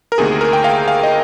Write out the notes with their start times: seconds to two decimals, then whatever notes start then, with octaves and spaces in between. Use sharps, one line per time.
0.12 A#4
0.18 D2 C3 D#3 A#3 G#4
0.41 A#4
0.53 G5
0.64 F5
0.88 F5
1.03 D#5